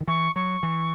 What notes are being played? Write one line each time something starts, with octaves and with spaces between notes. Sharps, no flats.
D#3
E3 C#6
F#3 C#6
E3